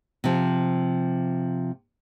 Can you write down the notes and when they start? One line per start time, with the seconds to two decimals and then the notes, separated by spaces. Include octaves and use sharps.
0.24 C3 F3